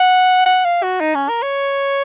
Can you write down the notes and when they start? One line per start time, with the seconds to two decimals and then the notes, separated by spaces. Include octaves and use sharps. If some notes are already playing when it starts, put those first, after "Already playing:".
Already playing: F#5
0.46 F#5
0.65 F5
0.83 F#4
1.01 D#4
1.15 C#4
1.29 A#4
1.42 C#5